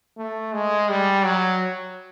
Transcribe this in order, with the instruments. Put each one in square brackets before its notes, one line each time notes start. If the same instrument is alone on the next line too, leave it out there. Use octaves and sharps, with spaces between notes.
[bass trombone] A3
G#3
G3
F#3